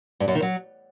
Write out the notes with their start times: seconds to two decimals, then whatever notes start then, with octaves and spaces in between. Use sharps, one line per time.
0.20 G2
0.28 F#2
0.35 D#3
0.42 F#3